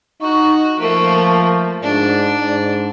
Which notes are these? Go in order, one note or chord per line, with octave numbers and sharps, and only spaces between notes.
D#4 F#4 C#6
F3 A3 A#3 C#6
G#2 D4 D5
G#2